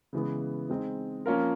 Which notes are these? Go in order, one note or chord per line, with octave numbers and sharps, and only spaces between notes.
C#3 E3 G#3 B3
G#3 C4 D#4
F3 A#3 C#4 F4 A#4